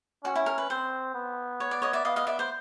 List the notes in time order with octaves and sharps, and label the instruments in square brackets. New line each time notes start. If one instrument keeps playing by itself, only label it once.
[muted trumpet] C#4 [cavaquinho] F#4
[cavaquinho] E4
A#4
B4
[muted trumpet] C4 [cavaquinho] C5
[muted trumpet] B3
[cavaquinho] C#5
D5
C#5 D#5
D5 E5
[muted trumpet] B3 [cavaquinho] D#5 F5
[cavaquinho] D#5 F5
D5 E5
C5